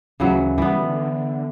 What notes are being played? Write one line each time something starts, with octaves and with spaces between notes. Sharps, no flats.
D2 C#3 E3 F#3
E3 G3 B3
D3